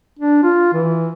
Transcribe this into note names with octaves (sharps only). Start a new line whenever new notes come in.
D4
F4
E3